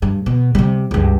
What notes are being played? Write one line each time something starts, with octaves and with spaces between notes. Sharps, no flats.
G2
B2
C3 G3
C#2 G2